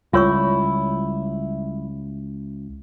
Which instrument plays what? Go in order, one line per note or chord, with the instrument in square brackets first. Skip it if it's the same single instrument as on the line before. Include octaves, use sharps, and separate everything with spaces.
[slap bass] C#2 [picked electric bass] G3 [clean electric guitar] E4 [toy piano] F4 C#5 C#6